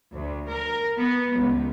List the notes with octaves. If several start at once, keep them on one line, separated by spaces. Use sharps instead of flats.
D2
A#4
B3
C#2